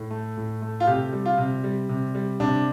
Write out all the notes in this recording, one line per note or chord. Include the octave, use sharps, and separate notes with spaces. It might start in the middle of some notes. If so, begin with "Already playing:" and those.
Already playing: A2
A3
A2
A3
F4
C3 G4
G3
F4
C3
G3
C3
G3
C3 D4